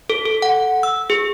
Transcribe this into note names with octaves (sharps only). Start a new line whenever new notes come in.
A4
A4
F#5
E6
G#4